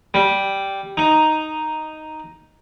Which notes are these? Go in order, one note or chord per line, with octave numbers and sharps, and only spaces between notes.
G3
D#4